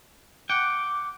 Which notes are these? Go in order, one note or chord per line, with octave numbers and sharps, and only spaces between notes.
F#5 G5 D6